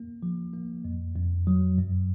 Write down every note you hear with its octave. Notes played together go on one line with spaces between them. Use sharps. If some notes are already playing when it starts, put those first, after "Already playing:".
Already playing: A#3
F3
A#3
F2
F2
F#3
F#2